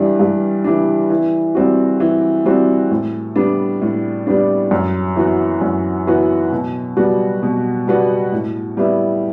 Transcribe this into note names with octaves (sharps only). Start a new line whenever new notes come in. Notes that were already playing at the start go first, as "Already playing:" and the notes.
Already playing: G2 E3 G3 D4
G2
E3 G3 D4
E3
G3 C4 F#4
E3
G3 C4 F#4
A2
G3 B3 D4
A2
G3 B3 D4
F#2
E3 B3 F#4
F#2
E3 B3 F#4
B2
G3 B3 F#4
B2
G3 B3 F#4
A2
G3 B3 E4